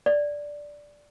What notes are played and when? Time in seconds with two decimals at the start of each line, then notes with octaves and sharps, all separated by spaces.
0.06 D5